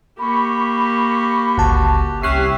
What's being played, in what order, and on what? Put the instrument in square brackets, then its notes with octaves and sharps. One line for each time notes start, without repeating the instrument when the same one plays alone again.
[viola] A#3 G4 [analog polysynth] B5 C#6
[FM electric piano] G1 C#2 A5 [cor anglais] F#4
[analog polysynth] C2 G4 [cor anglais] C#4 [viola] E5 [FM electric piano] F#6 C7